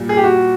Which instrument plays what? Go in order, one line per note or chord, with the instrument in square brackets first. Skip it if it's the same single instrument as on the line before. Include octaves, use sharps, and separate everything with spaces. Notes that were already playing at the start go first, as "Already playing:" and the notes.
Already playing: [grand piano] A#2 G3
G#4
G4
F#4